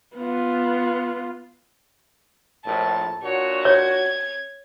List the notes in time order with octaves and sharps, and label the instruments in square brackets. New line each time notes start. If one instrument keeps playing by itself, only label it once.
[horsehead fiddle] B3 F4
[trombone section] A#1 A2 [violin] A5
[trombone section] A#2 D4 F#4 [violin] C#5
[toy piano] C#5 [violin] G#6